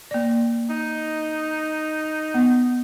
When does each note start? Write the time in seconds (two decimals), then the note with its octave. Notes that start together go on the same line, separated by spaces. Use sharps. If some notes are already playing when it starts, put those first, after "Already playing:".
0.11 A#3 D5
0.69 D#4
2.34 B3